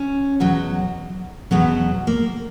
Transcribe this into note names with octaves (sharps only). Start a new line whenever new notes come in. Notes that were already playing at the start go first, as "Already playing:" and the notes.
Already playing: C#4
E2 B2 F#3
E2 B2 F#3 B3
A#3